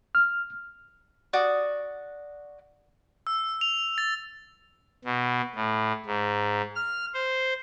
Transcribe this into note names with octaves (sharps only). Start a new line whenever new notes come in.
F6
F#4 D5 F#5 D#6
E6
F7
A6
B2
A2
G#2
F6
C5